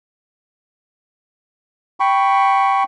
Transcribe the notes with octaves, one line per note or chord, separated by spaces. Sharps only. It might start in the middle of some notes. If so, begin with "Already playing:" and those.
G5 B5 C#6